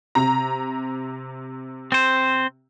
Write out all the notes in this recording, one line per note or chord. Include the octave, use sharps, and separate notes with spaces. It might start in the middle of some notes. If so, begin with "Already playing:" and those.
C3 A#5
C4 C5